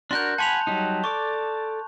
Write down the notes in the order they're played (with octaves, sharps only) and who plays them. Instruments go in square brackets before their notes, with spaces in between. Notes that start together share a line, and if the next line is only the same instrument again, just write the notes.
[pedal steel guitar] D4 F#4 A#4 [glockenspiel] C6 F#6 G6
[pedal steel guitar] F#5 G#5 B5 [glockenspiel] A5 C6 F7
[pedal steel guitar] F#3 G3 D#4
[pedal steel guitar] A4 D5 D6 [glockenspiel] C#6